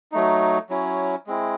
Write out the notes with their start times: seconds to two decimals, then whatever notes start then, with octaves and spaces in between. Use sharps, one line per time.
0.12 F#3 A3 D#4
0.70 F#3 C#4 E4
1.27 G#3 C4 E4